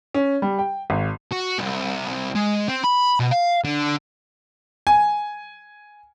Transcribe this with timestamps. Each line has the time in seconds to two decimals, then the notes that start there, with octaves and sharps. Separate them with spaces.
0.15 C#4
0.42 G3
0.59 G5
0.90 G#1
1.32 F#4
1.59 C2
2.35 G#3
2.68 C4
2.84 B5
3.20 B2
3.31 F5
3.64 D3
4.87 G#5